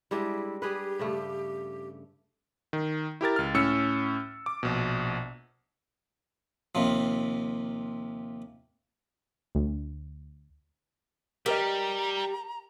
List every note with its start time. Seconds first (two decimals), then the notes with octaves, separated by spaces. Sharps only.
0.11 G3 G#3 D4 E4
0.62 G3 G4 G#4 B4
0.99 G2 C#3 A3
2.73 D#3
3.21 E4 G4 A#4 A6
3.36 C#2 F6
3.54 A2 C#4 E6 C#7
4.46 D6
4.63 A#1 B2
6.75 D#2 C3 F3
9.55 D2
11.46 G3 G4 A#4 B4 D#5 A#5